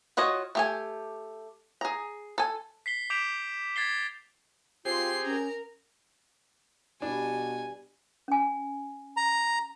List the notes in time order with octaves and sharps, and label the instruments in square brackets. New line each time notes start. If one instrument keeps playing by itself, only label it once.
[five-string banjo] F4 F#4 C#5 D#5
A3 G4 G#5
G#4 A#5
A4 G#5
[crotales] B6 C7 G7
D6 G6 B6 D7 E7 F7
G#6 A6 B6 C7 G7
[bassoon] C4 [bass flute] F4 [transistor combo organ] G4 G#4 [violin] C6 C7
[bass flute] C#4 [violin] A#4 A#5
[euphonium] B2 [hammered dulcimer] G3 [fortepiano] D4 [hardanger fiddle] G#5
[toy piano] C#4 G#5
[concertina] A#5